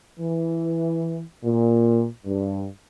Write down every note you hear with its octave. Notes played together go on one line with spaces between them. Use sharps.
E3
A#2
G2